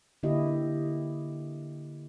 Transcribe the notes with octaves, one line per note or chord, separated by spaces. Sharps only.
D3 A#3 E4 G4 D#5